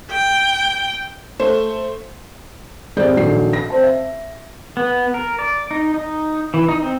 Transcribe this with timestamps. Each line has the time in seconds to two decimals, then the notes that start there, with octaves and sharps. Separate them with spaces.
0.11 G5
1.39 A3 C5
2.96 G#1 G3 C4 G#4 D5 G6
3.17 A#1 D#3 F#3 A4 C7
3.53 A#6
3.70 C4 C5 A5
3.84 E5
4.77 B3
5.14 A#4
5.39 D5
5.71 D#4
5.94 D#4
6.54 E3
6.69 D#4
6.82 C4